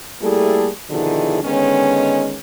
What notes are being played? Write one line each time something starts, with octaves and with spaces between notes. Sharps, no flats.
G3 A3 A#3 E4 G#4 A4
B2 D3 D#3 F3 E4 G#4
D3 D#3 G#3 B3 C#4